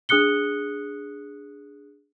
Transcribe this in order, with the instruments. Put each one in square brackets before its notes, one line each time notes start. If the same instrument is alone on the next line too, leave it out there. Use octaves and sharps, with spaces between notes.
[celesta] D4 G#4 D#6 F#6 C#7 G7